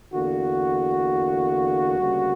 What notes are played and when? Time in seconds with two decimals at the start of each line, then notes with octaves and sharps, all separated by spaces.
0.13 E2 D3 A#3 F#4
1.99 D2 C#3 G3 A#3